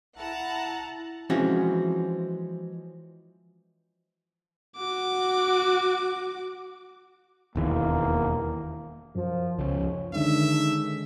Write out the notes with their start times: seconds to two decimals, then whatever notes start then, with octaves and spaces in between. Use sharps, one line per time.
0.18 E4 F#5 A5 A#5
1.30 E3 F3 G#3 C4 C#4 F#4
4.77 F#4 D6
7.56 E1 D#2 E3 A#3
9.15 F#2 F3
9.59 C#2 F3 C#4
10.13 D3 D#3 G#3 C#4 D4 E5